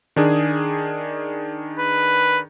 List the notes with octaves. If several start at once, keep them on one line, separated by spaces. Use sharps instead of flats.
D#3 D4 G#4
B4